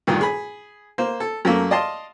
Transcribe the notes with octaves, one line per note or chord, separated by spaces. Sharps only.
D2 G2 A#2 D#3
G#4 B5
A#3 C5
A4
F#2 A3 A#3 C#4
D5 D#5 F5 A5 C6